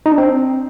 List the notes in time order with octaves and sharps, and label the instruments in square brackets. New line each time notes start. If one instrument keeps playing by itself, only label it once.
[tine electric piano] D#4
D4
C4